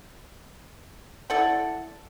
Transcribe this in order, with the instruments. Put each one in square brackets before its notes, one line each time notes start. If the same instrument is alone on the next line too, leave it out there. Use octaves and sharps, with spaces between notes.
[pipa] E4 A4 D5 F#5